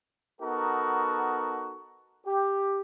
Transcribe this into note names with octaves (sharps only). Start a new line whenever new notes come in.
B3 D#4 F#4 A4 A#4
G4